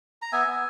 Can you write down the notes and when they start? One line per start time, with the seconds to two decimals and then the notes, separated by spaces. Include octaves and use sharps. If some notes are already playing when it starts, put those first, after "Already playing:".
0.22 A#5
0.32 B3 E5 G#5
0.47 B3